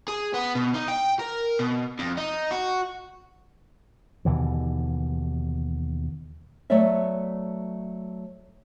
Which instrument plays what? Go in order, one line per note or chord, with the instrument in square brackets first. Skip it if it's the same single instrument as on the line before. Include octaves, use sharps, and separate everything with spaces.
[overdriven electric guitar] G#4
B3
B2
D#4
G5
A#4
B2
F2
D#4
F#4
[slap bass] D#2 B2 D3 E3
[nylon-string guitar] F#3 A3 B3 C#5 D5 E5